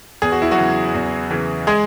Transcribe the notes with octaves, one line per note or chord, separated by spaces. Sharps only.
E2 G#4
F#4
E4
F#3 F#4
C#3 E3
E2
C#3 E3
G#3 G#4